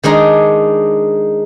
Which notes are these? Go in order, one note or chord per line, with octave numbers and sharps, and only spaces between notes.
D#3 G#3 D4 D#4